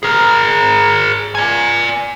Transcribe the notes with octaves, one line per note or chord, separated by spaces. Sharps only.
G#4 A#4
D5 G#5